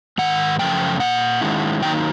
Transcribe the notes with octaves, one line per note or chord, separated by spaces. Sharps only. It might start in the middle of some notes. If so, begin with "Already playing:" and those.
G#2 D#3 F#5
F#2 C#3 F3 A3 G5
A#2 G3 A#3 F#5
D#3 G#3 C#4 E4
D#3 F#3 A#3 D#4 G5